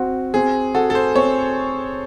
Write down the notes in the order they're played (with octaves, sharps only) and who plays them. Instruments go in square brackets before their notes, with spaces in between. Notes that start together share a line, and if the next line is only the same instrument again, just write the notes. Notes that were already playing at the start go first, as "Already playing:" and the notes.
Already playing: [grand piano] C4 F#4
[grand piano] C4 [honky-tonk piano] G#4
[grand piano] F#4 [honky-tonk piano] A4
[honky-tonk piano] A4
C5
[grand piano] C4 [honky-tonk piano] C#5